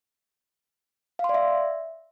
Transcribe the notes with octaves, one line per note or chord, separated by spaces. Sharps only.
F5
C6
D5
E5